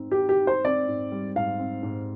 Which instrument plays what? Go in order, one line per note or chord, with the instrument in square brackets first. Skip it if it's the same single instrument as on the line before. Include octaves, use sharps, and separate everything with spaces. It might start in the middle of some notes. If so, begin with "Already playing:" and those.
Already playing: [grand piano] G#2 C4 D#4
[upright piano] G4
[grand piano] D#4
[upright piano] G4
[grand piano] D#4
[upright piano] C5
[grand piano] C4 [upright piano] D5
[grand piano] G#2
G3
[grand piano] G#2 [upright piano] F5
[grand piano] C4
G#2